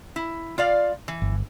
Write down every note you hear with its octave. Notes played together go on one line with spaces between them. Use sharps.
E4
F4 D5 F5
E3
G1